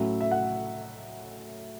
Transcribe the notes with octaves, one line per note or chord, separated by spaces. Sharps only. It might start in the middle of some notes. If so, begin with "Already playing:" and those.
Already playing: A2 F#3 C#4 E4 E5
E5
F#5